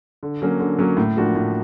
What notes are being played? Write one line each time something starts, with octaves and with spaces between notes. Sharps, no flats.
D3
F#3 A#3 C#4
D3
F#3 A#3 C#4
A2
F3 A#3 D4 F#4
A2